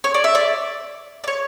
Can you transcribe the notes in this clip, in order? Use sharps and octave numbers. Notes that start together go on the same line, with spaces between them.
C#5
D5
E5
D5
D5
C#5